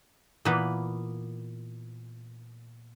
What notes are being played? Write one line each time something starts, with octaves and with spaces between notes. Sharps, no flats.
A#2 E3 A#3 B3 B4